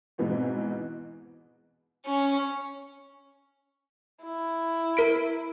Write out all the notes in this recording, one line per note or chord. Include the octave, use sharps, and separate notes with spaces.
G#2 B2 E3 B3 C4
C#4
E4
A#4 B6 D7